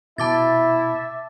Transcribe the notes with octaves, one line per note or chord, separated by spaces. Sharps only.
B2 E4 E5 A5 D6 A6